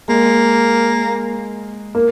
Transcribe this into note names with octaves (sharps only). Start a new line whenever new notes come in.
G#3 A#3
A#3